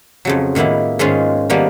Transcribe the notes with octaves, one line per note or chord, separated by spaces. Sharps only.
F2 C#3 F#3
A2 D#3 A#3 B3 E4
G#2 D#3 G#3 C#4 F4
D#3 F3 G3 A#3 B3